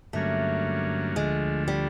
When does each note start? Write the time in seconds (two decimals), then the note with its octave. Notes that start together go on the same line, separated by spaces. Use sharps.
0.13 G2 D3 F#3 A3 A#3 C#4
1.16 D2 D3 F3 G#3 A3
1.68 G3